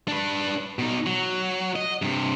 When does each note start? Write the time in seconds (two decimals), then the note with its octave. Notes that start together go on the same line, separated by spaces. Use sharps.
0.08 D4 B4
0.79 B2 D#4
1.06 F#3
1.76 D#5
2.02 G2 C3